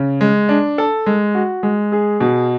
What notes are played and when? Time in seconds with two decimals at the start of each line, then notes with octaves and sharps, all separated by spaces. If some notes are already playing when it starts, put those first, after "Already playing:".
Already playing: C#3
0.21 G#3
0.49 D4
0.78 A4
1.06 G#3
1.35 F#4
1.63 G#3
1.92 G#4
2.20 B2